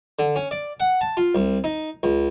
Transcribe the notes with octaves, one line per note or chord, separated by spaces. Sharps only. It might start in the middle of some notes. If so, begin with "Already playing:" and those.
D3
C#4
D5
F#5
A5
F4
C2
D#4
C#2